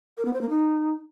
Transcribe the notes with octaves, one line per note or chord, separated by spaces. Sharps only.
A#4
B3
C5
A#3
D#4